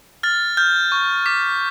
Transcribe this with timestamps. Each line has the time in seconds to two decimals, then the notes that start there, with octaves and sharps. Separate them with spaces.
0.23 F6 A6
0.57 F6 G6
0.92 C#6
1.26 D6 B6